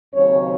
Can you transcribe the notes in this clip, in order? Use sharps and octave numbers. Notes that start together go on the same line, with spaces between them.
D#2 C#3 F#3 C4 C#5